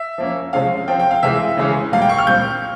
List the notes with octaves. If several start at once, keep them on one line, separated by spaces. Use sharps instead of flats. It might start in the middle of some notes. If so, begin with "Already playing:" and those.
Already playing: E5
F3 A#3 C#4
C3 F3 G#3 C#4 F5
F3 C4 G5
G5
F5
C3 E3 G#3 E5
C#3 E3 G#3 C#4
A#2 G3 A#3 F5
G5
C#6
F6
A#2 G3 C4 G6